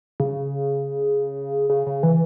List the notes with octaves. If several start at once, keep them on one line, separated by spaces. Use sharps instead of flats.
C#3
C#3
C#3
E3